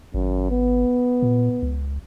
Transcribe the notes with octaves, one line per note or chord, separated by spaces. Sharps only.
G#1 F#2
B3
A#2
C#2